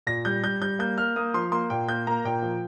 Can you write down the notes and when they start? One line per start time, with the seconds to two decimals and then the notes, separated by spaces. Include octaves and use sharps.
0.07 A#2 A#6
0.25 G3 G6
0.43 G3 G6
0.62 G3 G6
0.79 A#3 G6
0.98 A#3 F6
1.16 A#3 D#6
1.34 F3 C6
1.52 A#3 C6
1.70 A#2 G5
1.88 A#3 G6
2.07 A#3 A#5
2.25 A#2 G5
2.42 F3